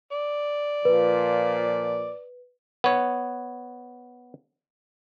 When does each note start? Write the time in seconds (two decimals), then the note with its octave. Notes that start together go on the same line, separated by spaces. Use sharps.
0.12 D5
0.85 A#2 F3 B4
2.84 B3 C#5